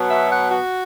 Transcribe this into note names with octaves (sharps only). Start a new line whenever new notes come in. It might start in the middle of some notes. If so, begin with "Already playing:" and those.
Already playing: B2 F#3 B3
E5
F#5
F#4